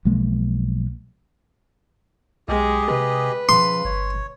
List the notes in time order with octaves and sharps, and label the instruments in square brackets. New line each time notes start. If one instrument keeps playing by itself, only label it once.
[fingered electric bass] B1 F3 G#3 A#3
[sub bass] B1 [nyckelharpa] G#3 [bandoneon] G4 G#4 D#5
[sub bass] C3 [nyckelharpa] B4
[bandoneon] C#3 [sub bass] F3 [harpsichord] C6
[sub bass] G1 [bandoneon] C#5